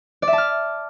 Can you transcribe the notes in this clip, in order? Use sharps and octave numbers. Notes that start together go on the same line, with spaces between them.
D5
E5
A5
F6